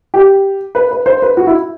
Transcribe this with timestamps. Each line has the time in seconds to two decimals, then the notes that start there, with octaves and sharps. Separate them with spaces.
0.14 G4
0.75 B4
0.91 B4
1.06 C5
1.22 B4
1.37 F#4
1.47 E4